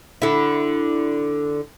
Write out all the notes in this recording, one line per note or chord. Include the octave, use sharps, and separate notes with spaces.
D3 E4